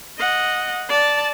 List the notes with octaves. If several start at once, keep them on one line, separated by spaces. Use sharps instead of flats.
D#5 F#5
D5 A5